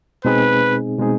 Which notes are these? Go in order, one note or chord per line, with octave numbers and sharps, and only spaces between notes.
B2 G#3 C4 D#4 G#4 B4
B2 G#3 C4 D#4 G#4